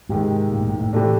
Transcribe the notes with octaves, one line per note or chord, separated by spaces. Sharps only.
G#2 C3 D#3 G#3
A#2
A2
G#2
A2
C3 E3 A3 D4